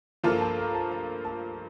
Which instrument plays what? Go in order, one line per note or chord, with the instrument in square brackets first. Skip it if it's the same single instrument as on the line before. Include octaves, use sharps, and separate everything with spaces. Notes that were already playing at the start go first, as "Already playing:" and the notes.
[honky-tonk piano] G2 F3 A#3 F4 A4 [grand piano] A#4
[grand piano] A5
A#5
A5
A#5
A5